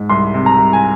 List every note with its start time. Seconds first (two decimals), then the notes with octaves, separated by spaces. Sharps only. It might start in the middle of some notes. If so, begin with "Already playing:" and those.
Already playing: G#2
0.09 C2 C6
0.34 C3
0.46 A#5
0.58 C2
0.73 G#5